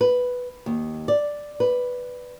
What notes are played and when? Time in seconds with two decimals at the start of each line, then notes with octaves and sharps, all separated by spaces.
0.01 B4
0.66 D#2
1.08 D5
1.60 B4